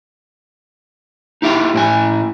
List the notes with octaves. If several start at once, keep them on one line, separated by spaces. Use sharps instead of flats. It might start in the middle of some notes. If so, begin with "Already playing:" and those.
D#4 E4 G4 F5
A2 E4 G#5